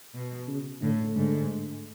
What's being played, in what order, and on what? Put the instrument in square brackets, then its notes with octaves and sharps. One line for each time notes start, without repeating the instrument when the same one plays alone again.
[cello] B2
[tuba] C#3
[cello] A2 [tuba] D3
[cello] G#2 [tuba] D3